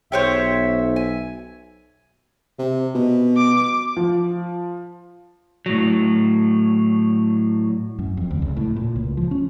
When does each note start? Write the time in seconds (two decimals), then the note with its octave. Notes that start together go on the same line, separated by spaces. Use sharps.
0.12 B1 C5 C#5 E5 G5
0.96 G#5
2.59 C3
2.95 B2
3.37 D6
3.97 F3
5.66 A2 F#3
7.99 F#2
8.17 F2
8.31 D2
8.42 C#2
8.57 A2
8.76 A#2
8.96 C#2
9.17 F3
9.31 C#4